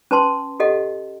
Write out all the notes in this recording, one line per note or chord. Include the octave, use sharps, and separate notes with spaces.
C#4 B4 A5 C6
G4 A4 D#5 F#5